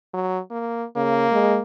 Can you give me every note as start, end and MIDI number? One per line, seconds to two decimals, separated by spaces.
0.13 0.39 54
0.50 0.84 58
0.96 1.27 49
0.96 1.62 58
1.32 1.58 56